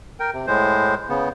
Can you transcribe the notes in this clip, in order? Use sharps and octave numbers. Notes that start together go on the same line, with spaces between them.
A#4 G5
C3
A2 G#3 C5
C#3 B3